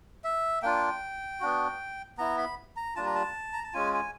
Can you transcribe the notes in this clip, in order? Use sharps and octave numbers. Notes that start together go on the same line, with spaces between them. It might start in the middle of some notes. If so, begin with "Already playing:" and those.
E5
A#3 D4 F4 G5
B3 D4 F#4
B3 E4 A#5
B5
A#5
G3 A#3 D4 F4 A5
A#5
A5
A#5
A5
G#3 C#4 F4 G#5
G#5